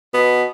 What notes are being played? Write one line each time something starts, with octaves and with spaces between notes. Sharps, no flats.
B2 B3